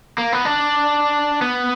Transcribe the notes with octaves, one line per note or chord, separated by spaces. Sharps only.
A#3
B3
D4
B3